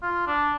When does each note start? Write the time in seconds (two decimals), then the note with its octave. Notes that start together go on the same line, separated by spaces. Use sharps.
0.03 F4
0.27 D4